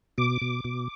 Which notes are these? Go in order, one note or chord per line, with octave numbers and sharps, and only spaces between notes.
B2 D6
B2
B2